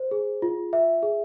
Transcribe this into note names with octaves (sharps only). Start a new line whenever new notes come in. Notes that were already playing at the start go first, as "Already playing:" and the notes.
Already playing: C5
G#4
F4
E5
G#4